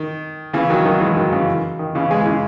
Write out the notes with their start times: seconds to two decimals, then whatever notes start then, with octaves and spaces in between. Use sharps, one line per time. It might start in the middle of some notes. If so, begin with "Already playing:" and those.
Already playing: D#3
0.53 C#3 E3
0.70 D#3 F#3
0.85 D#3 F#3
1.00 E3 G#3
1.16 D#3 F#3
1.32 C#3 E3
1.79 D#3
1.95 C#3 E3
2.11 E3 G#3
2.26 C#3 E3